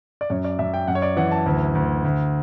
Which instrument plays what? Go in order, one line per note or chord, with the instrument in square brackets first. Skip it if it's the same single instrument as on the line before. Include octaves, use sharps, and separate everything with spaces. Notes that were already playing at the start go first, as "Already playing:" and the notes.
[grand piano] D5
F#2 C#5
D5
F#2 E5
G5
F#2 F#5
C#5
D5
E3 F#5
A5
D2
D2
D2